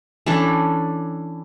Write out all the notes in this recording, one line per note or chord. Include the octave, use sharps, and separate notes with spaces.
E3 C#4 D4 A4